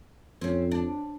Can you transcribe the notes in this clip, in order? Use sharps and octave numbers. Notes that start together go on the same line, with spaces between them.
F2 C4 C#4
D4